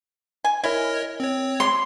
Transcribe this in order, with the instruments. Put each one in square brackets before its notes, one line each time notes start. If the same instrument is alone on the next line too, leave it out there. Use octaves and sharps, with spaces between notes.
[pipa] G#5
[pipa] E4 [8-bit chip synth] A#4 C#5 D#5
[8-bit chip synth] C4 C#5
[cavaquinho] C6